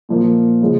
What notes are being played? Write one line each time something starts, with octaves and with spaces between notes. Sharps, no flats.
A#2 F3 A#3
C#3 F3 G#3